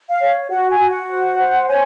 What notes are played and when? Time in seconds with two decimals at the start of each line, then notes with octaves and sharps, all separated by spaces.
0.10 F5
0.20 C#5
0.50 F#4 F#5
0.70 G#5
0.79 F#4
0.89 F#5
1.08 C5
1.38 C5
1.68 C#5 G#5